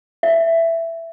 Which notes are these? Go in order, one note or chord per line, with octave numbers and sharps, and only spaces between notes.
E5